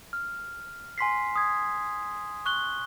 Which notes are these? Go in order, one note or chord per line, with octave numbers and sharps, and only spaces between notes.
F6
G#5 C6 B6 C7
D#6 G#6
C#6 F#6 G7